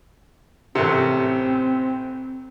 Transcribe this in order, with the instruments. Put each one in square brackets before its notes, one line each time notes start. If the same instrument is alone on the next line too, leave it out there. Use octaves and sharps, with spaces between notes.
[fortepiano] A1 C3 [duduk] C4